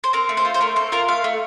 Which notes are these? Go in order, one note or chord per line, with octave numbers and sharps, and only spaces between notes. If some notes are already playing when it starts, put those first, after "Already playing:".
C5
C4 A#4
A3
C5
F4
C5
A3 A#4
C4 A4
F4 A#4
A3 F5
A3